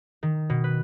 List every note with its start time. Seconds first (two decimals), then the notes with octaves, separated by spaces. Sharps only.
0.23 D#3
0.50 B2
0.64 B4